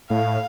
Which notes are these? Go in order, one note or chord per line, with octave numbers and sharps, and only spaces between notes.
A2 F5